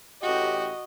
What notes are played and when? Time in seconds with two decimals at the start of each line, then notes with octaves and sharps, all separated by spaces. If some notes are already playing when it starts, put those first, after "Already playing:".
0.23 A1 F#4 G4 D#5